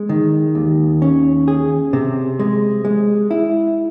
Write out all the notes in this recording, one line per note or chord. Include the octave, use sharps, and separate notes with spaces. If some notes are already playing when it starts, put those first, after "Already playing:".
Already playing: G#3
D#3
D#2
C#4
G#4
C3
G#3
G#3
E4